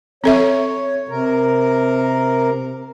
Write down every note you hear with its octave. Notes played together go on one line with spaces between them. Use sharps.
C4 A4 C#5 E5
C3 A#4